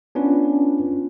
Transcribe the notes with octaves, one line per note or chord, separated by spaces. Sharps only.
B3 C#4 D4 F4 B4